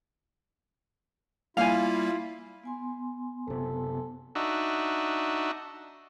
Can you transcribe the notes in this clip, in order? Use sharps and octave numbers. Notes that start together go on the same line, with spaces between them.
G3 A#3 E4 F4 F5 G#5
B3 G#5 C6
F#1 C3 A4
D4 D#4 F#4 E5